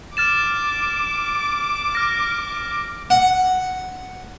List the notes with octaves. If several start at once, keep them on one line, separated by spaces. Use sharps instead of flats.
D6 F6 A6 E7
F6 A#6
F#5